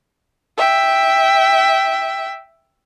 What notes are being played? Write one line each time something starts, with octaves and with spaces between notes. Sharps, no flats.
E5 G5